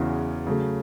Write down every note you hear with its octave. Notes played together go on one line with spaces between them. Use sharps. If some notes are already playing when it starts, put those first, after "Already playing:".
Already playing: E2 C#3 E3 C#4 F#4
C#3 F#3 A3